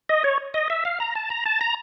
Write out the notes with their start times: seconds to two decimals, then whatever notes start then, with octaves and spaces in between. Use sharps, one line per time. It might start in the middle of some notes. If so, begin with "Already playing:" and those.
0.09 D#5
0.24 C#5
0.54 D#5
0.70 E5
0.85 F5
1.00 A#5
1.15 A5
1.30 A#5
1.46 A5
1.61 A#5